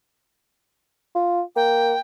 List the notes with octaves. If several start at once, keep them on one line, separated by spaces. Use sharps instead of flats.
F4
A#3 G5